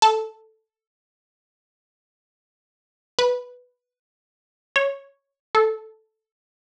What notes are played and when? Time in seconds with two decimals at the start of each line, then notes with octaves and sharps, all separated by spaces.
0.02 A4
3.19 B4
4.76 C#5
5.55 A4